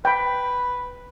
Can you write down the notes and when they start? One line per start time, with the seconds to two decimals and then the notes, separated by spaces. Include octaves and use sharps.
0.05 B4 G5 B5